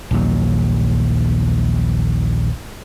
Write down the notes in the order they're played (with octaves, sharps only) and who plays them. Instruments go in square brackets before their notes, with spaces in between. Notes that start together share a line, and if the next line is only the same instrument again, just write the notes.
[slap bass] A#1 D#2 F#3